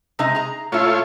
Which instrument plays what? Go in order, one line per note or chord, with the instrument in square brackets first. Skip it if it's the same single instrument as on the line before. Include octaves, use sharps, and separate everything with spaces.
[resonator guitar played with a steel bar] C3 G#3 D#4
G#4 A#5
[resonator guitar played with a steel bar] A#2 E4 [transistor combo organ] A3 F4 C#5